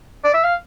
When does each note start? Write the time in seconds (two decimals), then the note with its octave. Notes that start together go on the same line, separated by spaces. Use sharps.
0.24 D5
0.34 E5
0.44 F5